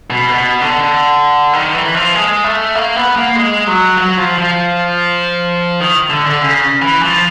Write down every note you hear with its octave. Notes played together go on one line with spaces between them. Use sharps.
B2
B2
D3
D#3
E3
F3
G#3
A3
A#3
B3
A#3
G#3
F#3
F#3
F3
F3
D#3
D3
D3
C#3
E3
F3